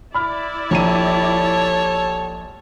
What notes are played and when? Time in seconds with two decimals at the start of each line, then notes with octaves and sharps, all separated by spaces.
0.14 E4 D5 B5 F6
0.71 A#1 G4 A4 C#5 A5 A#5 D#7